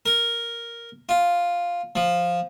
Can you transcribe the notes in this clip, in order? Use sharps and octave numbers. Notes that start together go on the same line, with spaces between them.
A#4
F4
F3